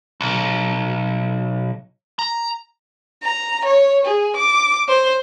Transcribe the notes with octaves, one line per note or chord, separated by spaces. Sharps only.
B1
A#5
A#5
C#5
G#4
D6
C5